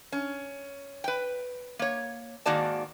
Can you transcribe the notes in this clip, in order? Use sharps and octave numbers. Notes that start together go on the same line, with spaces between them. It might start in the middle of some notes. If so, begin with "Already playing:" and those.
C#4
B4 G5
A#3 C#5
G#2 D#3 A#3 F#4 D5 A5